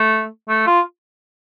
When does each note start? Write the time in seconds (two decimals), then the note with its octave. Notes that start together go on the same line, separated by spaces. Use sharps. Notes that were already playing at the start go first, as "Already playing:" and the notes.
Already playing: A3
0.49 A3
0.67 F4